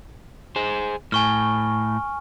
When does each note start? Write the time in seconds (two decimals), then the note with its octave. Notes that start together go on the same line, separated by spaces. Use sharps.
0.56 G#4 C5
1.12 A2 G#5 C#6 F6